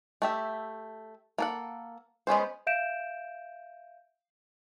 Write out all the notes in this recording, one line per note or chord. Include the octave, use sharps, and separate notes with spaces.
A3 G4 E5
A#3 A4 F#5
G#3 B3 C#4 C5
E5 F5 G6 D7 E7